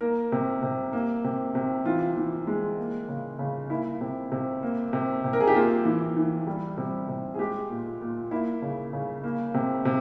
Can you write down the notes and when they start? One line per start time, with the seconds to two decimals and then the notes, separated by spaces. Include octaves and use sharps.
0.01 A#3 A#4
0.32 C3
0.63 C3
0.93 A#3
1.24 C3
1.55 C3
1.85 E3 F4
2.16 E3
2.47 G#3
2.78 A#3
3.09 C#3
3.39 C#3
3.70 A#3 E4
4.01 C3
4.32 C3
4.63 A#3
4.93 C3
5.24 C3
5.33 A#4
5.40 G#4
5.47 G4
5.55 A#3 F4
5.85 E3
6.17 E3
6.47 G3
6.77 C3
7.09 C3
7.34 G#4
7.39 G#3 G4
7.70 A#2
8.01 A#2
8.31 A#3 E4
8.62 C#3
8.93 C#3
9.24 A#3
9.54 C3
9.85 C3